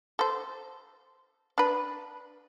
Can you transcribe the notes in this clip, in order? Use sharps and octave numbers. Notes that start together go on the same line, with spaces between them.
A4 C5
D4 B4